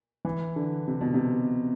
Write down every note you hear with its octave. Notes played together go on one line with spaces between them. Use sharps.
E3
D3
C3
B2
C3